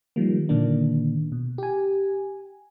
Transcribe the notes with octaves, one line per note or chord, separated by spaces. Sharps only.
D#3 F3 G3 A#3
A#2 D3 D#3 A#3 D4
B2
G4 G#5